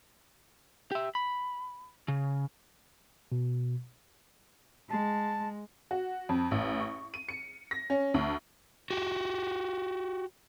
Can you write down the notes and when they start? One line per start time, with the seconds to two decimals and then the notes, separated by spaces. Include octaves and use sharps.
0.91 G4 E5
1.15 B5
2.08 C#3
3.32 B2
4.90 G#3 A5
5.91 F#4
6.29 F2
6.51 A1
6.80 C#6
7.14 D#7
7.29 C#7
7.71 A#6
7.90 C#4
8.14 D2
8.91 F#4 G4